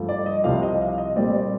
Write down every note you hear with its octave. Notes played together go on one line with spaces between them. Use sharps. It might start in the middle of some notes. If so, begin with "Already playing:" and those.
Already playing: G2 F3 A3
D5
D#5
C2 C3 F3 F5
D#5
F5
D#5
A#2 G3 C4 D5
D5